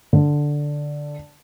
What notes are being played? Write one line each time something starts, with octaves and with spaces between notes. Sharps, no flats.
D3